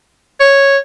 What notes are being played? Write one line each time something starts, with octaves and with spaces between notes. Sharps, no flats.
C#5